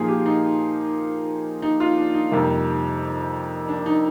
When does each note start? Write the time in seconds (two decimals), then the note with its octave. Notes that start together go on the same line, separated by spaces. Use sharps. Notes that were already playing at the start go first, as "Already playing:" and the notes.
Already playing: A#2 F3 A#3 D#4 F4 G#4
0.08 G4
0.26 D#4
1.62 D#4
1.80 F4
1.97 D4
2.14 D#4
2.31 F2 C3 G3 A#3
3.68 D4
3.86 D#4